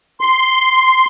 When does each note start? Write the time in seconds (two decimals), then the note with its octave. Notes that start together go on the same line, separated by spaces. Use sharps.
0.20 C6